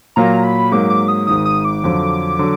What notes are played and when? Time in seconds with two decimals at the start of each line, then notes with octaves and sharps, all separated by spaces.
0.16 A#2 F#3 A#3 A#5
0.44 B5
0.72 G#2 F#3 A#3 D6
0.90 D6
1.08 D#6
1.27 G#1 G#2 D#3 D#6
1.46 D#6
1.65 D6
1.84 F2 D3 F#3
2.39 D3 F#3